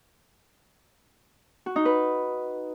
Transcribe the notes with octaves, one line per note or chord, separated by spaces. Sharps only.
F#4
D#4
B4